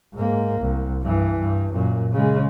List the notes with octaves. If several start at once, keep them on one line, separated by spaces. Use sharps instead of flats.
G#2 A#3
C2
G2 E3
G2
F#2 A#2
C#3 G#3